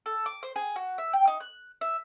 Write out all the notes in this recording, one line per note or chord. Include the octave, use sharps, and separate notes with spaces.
A4
D6
C5
G#4
F#4
E5
G5
D#4
F#6
E5